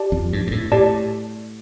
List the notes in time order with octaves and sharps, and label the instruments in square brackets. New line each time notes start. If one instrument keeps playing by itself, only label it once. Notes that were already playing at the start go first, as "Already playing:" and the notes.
Already playing: [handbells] G4 D5 A5
[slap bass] F2
G2
G2
A2
[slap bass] A2 [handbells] G4 D5 A5